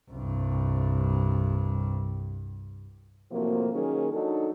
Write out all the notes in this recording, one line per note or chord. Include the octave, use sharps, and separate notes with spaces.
C2 G2
A2 C3 F3 F#3 A#3
D#3 F#3 A#3 C#4 G#4 A#4
F#3 D4 D#4 A4